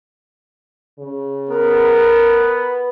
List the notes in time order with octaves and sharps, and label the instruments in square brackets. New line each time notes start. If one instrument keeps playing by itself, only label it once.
[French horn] C#3
[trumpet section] B3 [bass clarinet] A#4
[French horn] B4